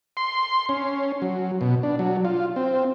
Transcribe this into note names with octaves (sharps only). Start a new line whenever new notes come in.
C6
C#4
F#3
B2
D4
F#3
F4
C4